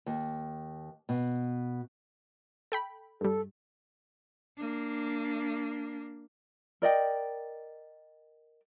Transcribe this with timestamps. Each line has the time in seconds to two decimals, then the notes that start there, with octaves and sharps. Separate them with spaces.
0.06 D#2
1.09 B2
2.72 A4 G5 B5
3.21 G2 G3 A4
4.57 A#3 D4
6.82 A#4 D5 D#5 G5